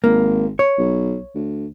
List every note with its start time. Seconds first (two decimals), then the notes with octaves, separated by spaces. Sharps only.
0.04 G#1 A#3
0.59 C#5
0.78 B1
1.35 D2